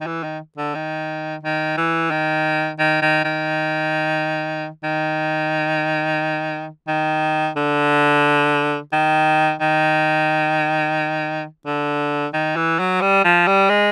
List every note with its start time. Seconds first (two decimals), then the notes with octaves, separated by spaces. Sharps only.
0.01 D#3
0.06 E3
0.24 D#3
0.57 D3
0.75 D#3
1.43 D#3
1.77 E3
2.11 D#3
2.79 D#3
3.02 D#3
3.25 D#3
4.83 D#3
6.88 D#3
7.56 D3
8.93 D#3
9.61 D#3
11.66 D3
12.33 D#3
12.56 E3
12.79 F#3
13.01 G3
13.25 F3
13.47 G3
13.69 G#3